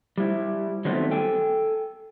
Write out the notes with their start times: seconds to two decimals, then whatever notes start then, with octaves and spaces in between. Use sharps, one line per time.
0.18 G3 E4
0.85 D#3 F#3 G3 A3 B3 C4
1.11 A4 G5 G#5